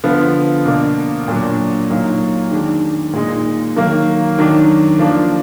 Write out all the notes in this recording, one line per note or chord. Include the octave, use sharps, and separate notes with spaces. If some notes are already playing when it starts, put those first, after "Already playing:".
D3 F3 B3
B2 A#3 D4
A#2 F#3 D4
A#2 F#3 A#3 D#4
D#3 G#3 D4
A#2 G#3 D#4
D#3 F#3 A#3
D#3 F#3 D4
F3 A#3 D4